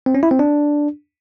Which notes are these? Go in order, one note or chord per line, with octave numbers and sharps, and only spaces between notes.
C4
C#4
E4
C4
D4